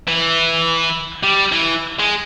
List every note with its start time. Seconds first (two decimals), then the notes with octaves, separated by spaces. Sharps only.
0.08 E3
1.23 G3
1.52 E3
2.00 G#3